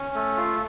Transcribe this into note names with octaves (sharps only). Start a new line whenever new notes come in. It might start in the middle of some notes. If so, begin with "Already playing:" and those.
Already playing: C#4
A3
F4